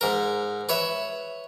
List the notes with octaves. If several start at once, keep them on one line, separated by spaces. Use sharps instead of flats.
G#2 A#4
B4 C#5 E5